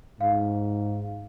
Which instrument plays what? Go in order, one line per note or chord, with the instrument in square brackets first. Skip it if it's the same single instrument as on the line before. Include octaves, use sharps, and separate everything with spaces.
[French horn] G#2 [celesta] F5